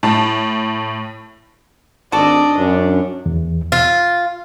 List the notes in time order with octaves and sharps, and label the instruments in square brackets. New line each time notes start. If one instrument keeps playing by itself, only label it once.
[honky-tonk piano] A2 A5
[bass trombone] G#1 [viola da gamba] D4 [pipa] F#4 A4 [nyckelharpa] D5 D#5
[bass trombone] F#2 [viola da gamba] C#4 [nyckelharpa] D4
[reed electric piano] E2
[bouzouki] F4